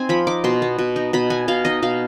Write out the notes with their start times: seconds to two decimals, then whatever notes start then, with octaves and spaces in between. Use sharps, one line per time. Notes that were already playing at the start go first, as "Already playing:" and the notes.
Already playing: C4 D#4 G#5
0.09 F3 B5
0.27 D#4 D6
0.44 B2 C6
0.62 B3
0.79 B2
0.96 D#4
1.13 B2 B5
1.30 B3 G#5
1.48 B2 F5
1.65 D#4 D#5
1.82 B2 F5